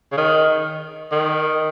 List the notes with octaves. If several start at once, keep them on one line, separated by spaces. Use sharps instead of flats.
C#3
D#3
D#3